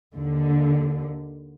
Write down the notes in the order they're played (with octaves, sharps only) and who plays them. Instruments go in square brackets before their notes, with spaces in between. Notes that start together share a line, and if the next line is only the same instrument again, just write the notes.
[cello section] D#2 D3